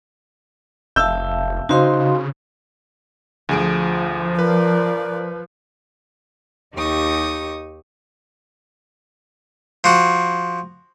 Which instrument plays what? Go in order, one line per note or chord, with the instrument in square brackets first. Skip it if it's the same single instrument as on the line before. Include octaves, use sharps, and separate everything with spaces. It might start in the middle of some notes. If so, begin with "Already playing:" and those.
[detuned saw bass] F1 [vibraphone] E5 F5 A5 [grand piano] E6 G6
[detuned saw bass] C#3 [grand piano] D#4 C5 [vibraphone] F#4 F5 C6
[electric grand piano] D2 G#4 D7 [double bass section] F3
[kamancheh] A#4 D5 [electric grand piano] B4
[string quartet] D#2 D#4 G4 C#6 D#6
[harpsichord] F3 F#4